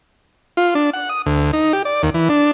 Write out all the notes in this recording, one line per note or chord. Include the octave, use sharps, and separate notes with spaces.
F4
D4
F#5
D#6
D2
D#4
G4
D5
D#2
E3
D4